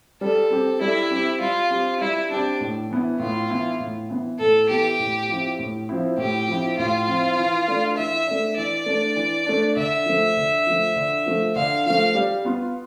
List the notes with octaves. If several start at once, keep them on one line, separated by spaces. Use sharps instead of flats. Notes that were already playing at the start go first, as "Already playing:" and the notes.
G3 A4
C4 G4
G3 E4
C4 G4
G3 F4
C4 G4
G3 E4
C4 D4 G4
A2
E3 B3 E4
A2 F4
E3 B3 E4
A2
E3 B3 E4
A2 A4
E3 B3 E4 G4
A2
F3 C4 E4
A2
F3 C4 E4
A2 G4
F3 C4 E4
A2 F4
F3 C4 E4
E3
A3 D4
E3 E5
A3 D4
E3 D5
A3 D4
E3
A3 D4
D3 E5
F3 A3
D3
F3 A3
D3
F3 A3
D3 F5
F3 A3 F5
G3
B3 F4